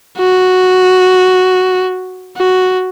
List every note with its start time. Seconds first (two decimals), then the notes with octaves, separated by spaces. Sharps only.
0.19 F#4
2.37 F#4